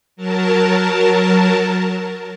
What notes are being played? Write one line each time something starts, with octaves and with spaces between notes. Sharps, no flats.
F#3 A#4 A5